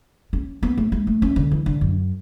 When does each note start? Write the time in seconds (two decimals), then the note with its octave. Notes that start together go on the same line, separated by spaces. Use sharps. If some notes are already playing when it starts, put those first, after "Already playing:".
0.33 C#4
0.63 B3
0.78 A3
0.92 G#3
1.07 A3
1.22 C#4
1.36 D3
1.51 E3
1.66 D3
1.81 F#2